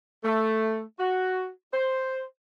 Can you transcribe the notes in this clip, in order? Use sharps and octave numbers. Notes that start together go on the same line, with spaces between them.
A3
F#4
C5